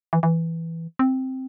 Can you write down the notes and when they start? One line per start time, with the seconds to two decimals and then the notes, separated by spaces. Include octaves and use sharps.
0.13 E3
0.23 E3
0.99 C4